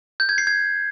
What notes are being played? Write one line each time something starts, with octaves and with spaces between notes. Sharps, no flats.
G6
G#6
C7
G#6